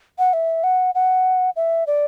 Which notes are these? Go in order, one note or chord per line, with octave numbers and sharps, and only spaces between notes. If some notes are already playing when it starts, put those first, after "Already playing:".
F#5
E5
F#5
F#5
E5
D5